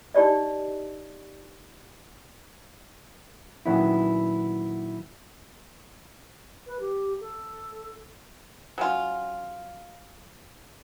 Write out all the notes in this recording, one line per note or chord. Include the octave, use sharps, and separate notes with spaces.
D4 D#4 G4 D5 D#5
A#2 D#3 F#3 B3 C#4 E4
B4
G4
A4
F#3 C#4 F4